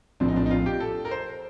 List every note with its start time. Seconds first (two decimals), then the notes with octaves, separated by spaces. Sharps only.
0.20 A#1 A2 F3 C4 D4
0.28 D#4
0.36 D4
0.46 D#4
0.51 F4
0.66 G4
0.80 A4
1.05 A#4
1.11 C5